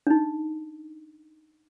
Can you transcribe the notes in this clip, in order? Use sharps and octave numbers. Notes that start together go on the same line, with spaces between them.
D4 D#4